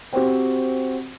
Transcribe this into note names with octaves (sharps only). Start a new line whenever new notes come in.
C4 F#4 G4 C5 G5